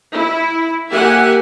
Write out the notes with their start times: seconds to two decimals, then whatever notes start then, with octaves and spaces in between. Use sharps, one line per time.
0.13 E4
0.90 A#3 G4 E5 F#5 G#5